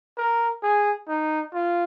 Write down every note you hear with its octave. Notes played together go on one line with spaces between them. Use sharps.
A#4
G#4
D#4
F4